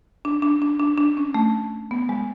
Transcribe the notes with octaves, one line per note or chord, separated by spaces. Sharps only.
D4
D4
D4
D4
D4
C#4
A3
B3
G#3